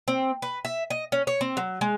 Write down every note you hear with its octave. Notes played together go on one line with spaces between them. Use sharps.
C4
B4
E5
D#5
C#4
C#5
C4
F#3
G#3